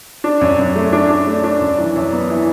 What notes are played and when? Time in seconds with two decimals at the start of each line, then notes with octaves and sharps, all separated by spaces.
0.24 D4
0.41 F#2
0.59 F#2
0.76 A3
0.93 D4
1.10 D4
1.27 A3
1.44 D4
1.61 F#2
1.78 E3
1.95 F#2
2.12 B3
2.30 E3